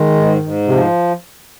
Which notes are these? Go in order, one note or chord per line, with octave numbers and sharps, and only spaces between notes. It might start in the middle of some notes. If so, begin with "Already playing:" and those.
Already playing: D#3 G#3
G#2
G#2
C3 F3